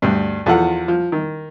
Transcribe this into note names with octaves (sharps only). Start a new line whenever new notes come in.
D2 G2
E2 F3 F4 A4 F#5
F3
D#3